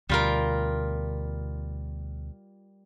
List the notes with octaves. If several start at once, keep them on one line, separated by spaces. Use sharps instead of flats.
D2 B2 G3 F4 A#4